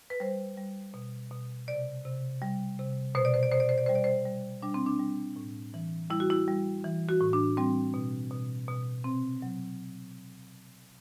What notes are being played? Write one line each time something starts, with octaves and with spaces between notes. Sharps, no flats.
B4
G3 C5
G3
B2
B2
C3 D5
C3
G3
C3
B2 C5
D5
C5
D5
B2 C5
D5
C5
D5
G3 C5
D5
C5
G3
G3 D4
C4
D4
G3
A2
E3
G3 E4
F#4
E4
G3
E3
F#4
A2
D4
G3 C4
B2
B2
B2
C3 C4
F#3